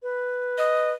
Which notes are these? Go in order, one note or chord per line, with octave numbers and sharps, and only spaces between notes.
B4
D#5